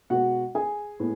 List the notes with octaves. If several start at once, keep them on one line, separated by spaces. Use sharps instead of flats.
B2 G#3 B3 F#4 F#5
G#4 G#5
A2 G#3 B3